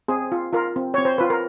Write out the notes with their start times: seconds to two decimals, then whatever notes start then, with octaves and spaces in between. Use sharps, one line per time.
0.08 C4 G#4
0.32 F4
0.53 F4 A#4
0.76 C4
0.94 C4 C#5
1.05 C5
1.18 F4 B4
1.30 A#4